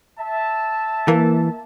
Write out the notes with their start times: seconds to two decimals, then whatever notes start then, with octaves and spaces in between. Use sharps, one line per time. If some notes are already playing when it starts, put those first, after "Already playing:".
0.19 E5 A5
1.08 E3 A#3